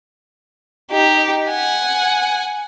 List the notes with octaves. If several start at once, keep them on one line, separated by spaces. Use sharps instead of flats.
D#4 G4
F#5 G#5